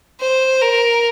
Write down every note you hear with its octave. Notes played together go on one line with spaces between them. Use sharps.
C5
A#4